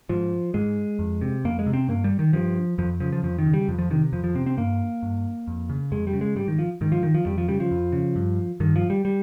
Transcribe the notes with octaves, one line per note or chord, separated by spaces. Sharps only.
G#2 F3
G#2 G#3
F2
C3
F2 A#3
G#3
C3
C4
G2 A#3
G3
D#3
G2 F3
F2 F3
C#3 F3
F3
F2 F3
D#3
C#3
G3
F2 F3
F3
C3 D#3
F2 F3
F3
C3 C4
C4
G2 A#3
G2
F2
C#3
F2 G#3
G3
C#3
G#3
G#2 G3
D#3
F3
G#2 D#3
F3
D#3
F3
F2 G3
F3
C#3 G3
F3
F2
C#3
G2
G2 D#3
F3
G3
G3